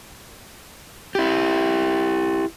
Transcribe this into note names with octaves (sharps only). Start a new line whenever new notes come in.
E4 G4